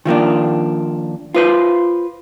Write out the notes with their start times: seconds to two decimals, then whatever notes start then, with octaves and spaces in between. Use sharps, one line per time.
0.05 D#3 F3 A#3 D4
1.34 F4 B4 C5